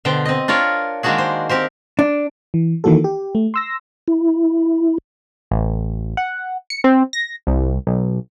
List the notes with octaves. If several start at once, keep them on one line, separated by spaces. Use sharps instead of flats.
B2 D3 C5 G5
C4 D#5
D4 F4 A#4 C#5
D#3 G#3 A#3 D4 F#4 G#4
C5
C4 G4 A#4 C5
D4
E3
D#3 E3 A#3 F#4 A4
G4
A3
C6 E6 A#6
E4
A1
F#5
C#7
C4
A#6
C2
B1